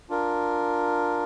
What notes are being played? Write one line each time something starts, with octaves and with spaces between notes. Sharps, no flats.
D4 F4 A#4